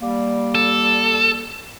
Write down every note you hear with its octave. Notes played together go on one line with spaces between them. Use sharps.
G3 A#3
A4